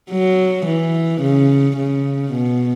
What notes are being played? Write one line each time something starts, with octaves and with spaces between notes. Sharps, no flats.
F#3
E3
C#3
C#3
B2